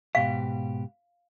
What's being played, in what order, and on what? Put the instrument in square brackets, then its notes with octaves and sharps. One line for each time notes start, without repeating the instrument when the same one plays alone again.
[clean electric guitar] G#2 B2 G4 [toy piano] F5